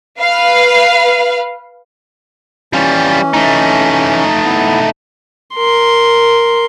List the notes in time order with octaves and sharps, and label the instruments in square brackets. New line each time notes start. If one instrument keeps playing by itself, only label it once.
[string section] B4 F5
[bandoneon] E3 C#4 [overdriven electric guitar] G3 F4
[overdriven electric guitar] A3 D#4
[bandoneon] B3 E4
[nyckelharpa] A#4 C6